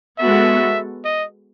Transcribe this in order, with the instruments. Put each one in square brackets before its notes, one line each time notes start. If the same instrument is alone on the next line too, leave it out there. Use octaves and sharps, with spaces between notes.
[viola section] G#3 B3 F#4 A4 [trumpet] E5
[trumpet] D#5